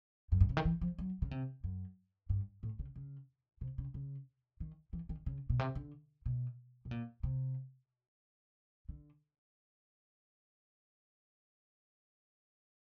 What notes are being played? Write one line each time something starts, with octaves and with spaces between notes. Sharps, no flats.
F#2
G2
C#3
D#3
E3
F3
F#3
C#3
C3
F#2
G2
A2
C#3
C#3
C3
C#3
C#3
D#3
E3
D#3
C#3
B2
C3
D3
B2
B2
A#2
C3
D3